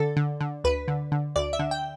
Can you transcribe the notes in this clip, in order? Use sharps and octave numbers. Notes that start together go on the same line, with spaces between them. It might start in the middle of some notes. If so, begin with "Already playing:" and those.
Already playing: D3 A4
D3
D3
D2 B4
D3
D3
D2 D5
E5
D3
G5